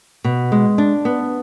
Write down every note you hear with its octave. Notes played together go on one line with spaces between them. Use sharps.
B2
G#3
D4
B3